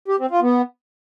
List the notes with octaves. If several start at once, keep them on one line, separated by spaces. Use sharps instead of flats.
G4
C4
F4
B3